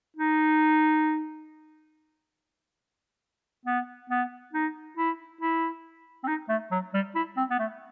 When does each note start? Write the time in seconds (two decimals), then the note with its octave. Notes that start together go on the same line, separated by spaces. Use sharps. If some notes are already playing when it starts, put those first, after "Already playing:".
0.17 D#4
3.66 B3
4.10 B3
4.53 D#4
4.97 E4
5.41 E4
6.23 C4
6.28 D#4
6.49 A3
6.71 F#3
6.94 G3
7.15 E4
7.37 C4
7.51 B3
7.59 A3